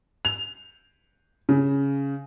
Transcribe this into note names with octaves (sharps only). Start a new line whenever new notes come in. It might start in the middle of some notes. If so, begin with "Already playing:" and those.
F7
C#3